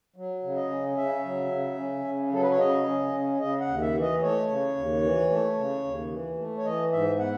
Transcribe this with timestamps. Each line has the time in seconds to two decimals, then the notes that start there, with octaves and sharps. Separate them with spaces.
0.16 F#3
0.43 C#3
0.56 D#5
0.70 C#4
0.97 C#3 E5
1.24 F#3
1.51 C#3
1.78 C#4
2.05 C#3
2.32 F#3 A4
2.42 B4
2.50 C#5
2.59 C#3 D#5
2.87 C#4
3.13 C#3
3.40 C#3 D#5
3.61 F#5
3.67 D#2
3.82 E5
3.95 E3
4.01 D#5
4.22 A3 C#5
4.49 C#3
4.76 D#2
5.03 E3
5.30 A3
5.57 C#3
5.84 D#2
6.12 E3
6.38 A3
6.58 C#5
6.65 E3 D#5
6.92 G#2 E5
7.19 B3 F#5